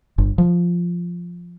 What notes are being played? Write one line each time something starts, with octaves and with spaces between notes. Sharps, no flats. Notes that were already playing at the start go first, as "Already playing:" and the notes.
G1
F3